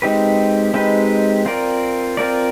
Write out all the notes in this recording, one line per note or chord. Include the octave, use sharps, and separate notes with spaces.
G#3 C4 D#4 G4 B4
G#3 C4 D#4 G4 B4
C4 F4 A#4 D5
C4 F4 A#4 D5